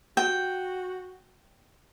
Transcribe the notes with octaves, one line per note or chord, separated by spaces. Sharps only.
F#4 G5